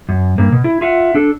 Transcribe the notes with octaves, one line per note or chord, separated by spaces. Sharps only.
F#2
G2 A#3
B2
E4
F4 E5 F#5
D4 A4